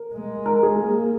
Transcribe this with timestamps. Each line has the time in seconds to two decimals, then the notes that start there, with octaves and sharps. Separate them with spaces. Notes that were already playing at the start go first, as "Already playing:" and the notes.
Already playing: A#4
0.14 G#3
0.46 A#4
0.63 G#4
0.79 A#3